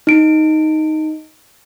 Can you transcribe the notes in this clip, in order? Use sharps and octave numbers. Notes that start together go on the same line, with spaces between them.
D#4 D7